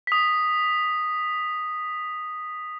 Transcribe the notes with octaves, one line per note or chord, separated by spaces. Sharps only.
D#6 B6